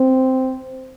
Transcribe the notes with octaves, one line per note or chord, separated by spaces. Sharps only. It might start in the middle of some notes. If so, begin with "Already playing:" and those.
Already playing: C4